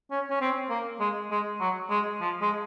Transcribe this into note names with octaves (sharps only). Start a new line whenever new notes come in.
C#4
C#4
C4
A#3
G#3
G#3
F#3
G#3
F3
G#3